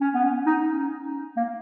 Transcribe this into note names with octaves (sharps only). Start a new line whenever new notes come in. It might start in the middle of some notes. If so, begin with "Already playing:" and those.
C#4
B3
C#4
D#4
C#4
A#3